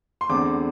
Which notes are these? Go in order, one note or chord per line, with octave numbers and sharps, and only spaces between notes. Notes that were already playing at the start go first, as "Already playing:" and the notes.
C6
E2 D3 A3 C4 D6